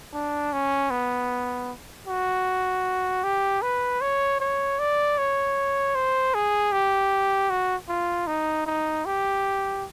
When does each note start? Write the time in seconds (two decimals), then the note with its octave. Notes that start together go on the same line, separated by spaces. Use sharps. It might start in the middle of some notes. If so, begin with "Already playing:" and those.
0.14 D4
0.53 C#4
0.91 B3
2.07 F#4
3.24 G4
3.62 B4
4.01 C#5
4.40 C#5
4.79 D5
5.18 C#5
5.95 C5
6.34 G#4
6.72 G4
7.50 F#4
7.88 F4
8.27 D#4
8.66 D#4
9.05 G4